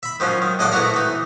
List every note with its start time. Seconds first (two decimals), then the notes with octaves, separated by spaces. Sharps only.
0.03 E5 B5
0.20 D#3 F3 F#3 C#4
0.42 D#3
0.59 A#1 A2 D#5 F#5 G#5 D6
0.71 A3 B3 E4 F#4 A#4
0.94 E3 D#4